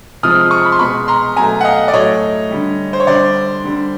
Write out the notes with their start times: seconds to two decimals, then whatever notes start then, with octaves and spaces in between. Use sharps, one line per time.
0.23 C3 F3 G#3 D#6 F6
0.51 C#6 D#6
0.65 B5
0.72 C6
0.79 B2 G#3 B5 C#6
1.08 A#5 C6
1.36 B2 F#3 A3 G#5 A#5
1.61 F#5
1.64 D#5 F5
1.88 D5
1.93 A2 F#3 A3 C#5 D#5
2.51 D3 G3
2.93 C5
3.00 C#5
3.07 D3 G3 C5 D5
3.64 D3 G3